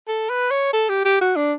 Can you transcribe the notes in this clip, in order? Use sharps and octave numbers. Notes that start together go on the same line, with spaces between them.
A4
B4
C#5
A4
G4
G4
F#4
D4